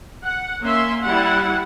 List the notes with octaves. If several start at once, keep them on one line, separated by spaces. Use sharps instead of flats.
F#5
A#3 C#4 E5 C6
G3 E4 F#5